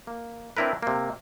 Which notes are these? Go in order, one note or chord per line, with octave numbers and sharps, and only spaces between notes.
A#3
C4 D4 E4 A#4 B4
C3 A#3